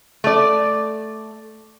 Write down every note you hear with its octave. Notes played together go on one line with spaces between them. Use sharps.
A3 D5